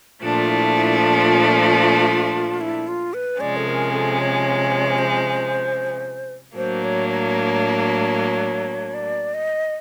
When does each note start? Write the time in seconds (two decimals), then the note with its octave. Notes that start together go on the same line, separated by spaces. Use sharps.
0.23 A#2 F3 A3 D4 F4
0.50 E4
0.76 E4
1.02 F4
2.61 E4
2.88 F4
3.14 B4
3.39 C3 F3 G#3 C#4 D5
3.57 A4
3.67 A#4
3.92 A4
4.19 C#5
4.98 C5
6.56 A2 F#3 A#3 D4 C5
6.83 C#5
7.09 C#5
8.94 D5
9.34 D#5